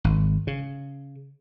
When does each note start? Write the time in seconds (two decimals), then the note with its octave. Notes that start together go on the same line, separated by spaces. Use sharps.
0.04 G#1
0.47 C#3